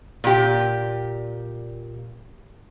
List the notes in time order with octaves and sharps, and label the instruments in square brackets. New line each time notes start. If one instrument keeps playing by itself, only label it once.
[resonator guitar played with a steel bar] A#2 G4